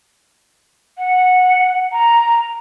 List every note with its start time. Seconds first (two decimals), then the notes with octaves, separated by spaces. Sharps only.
0.98 F#5
1.92 A#5